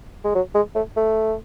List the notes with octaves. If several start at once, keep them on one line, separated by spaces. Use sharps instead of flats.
G#3
F#3
G#3
A3
A3